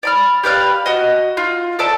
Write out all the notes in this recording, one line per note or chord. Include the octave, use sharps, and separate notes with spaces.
D5 B5 F6
G4 B4 D5 F5
F#4 D#5
F4
A4 D5 E5 A5